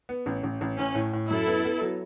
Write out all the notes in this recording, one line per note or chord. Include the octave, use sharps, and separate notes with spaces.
B3
A1
A1
A1
A1 C#4
A2
A2
F#2 E4 A4
B3
B3
F#3